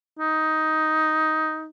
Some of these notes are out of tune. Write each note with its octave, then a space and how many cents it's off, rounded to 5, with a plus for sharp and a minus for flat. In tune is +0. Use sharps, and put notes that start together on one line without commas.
D#4 +10